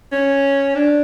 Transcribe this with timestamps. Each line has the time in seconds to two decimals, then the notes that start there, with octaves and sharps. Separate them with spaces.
0.12 C#4
0.75 D4